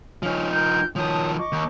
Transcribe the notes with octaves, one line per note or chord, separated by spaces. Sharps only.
F3 C#4 D#4 F6
A#4 F6 G6
D#3 F3 C#5 A5 D#6
D#5 C#6 D6
D#2